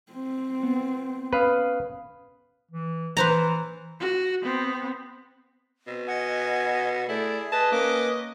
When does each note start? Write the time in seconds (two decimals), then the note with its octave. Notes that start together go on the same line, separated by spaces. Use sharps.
0.12 C4
0.63 B3
1.33 C#4 B4 F5 D#6
2.71 E3
3.17 E3 B4 C5 A#5
4.00 F#4
4.42 B3 C4
5.87 B2 C4
6.07 D#5 F#5 G#5
7.09 A3 E4 G#4 D5
7.52 B4 D#5 A5
7.72 A#3 C#4 D6